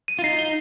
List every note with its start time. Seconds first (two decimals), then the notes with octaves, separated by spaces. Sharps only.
0.08 D#7
0.19 F4
0.24 D#4 C7
0.39 G7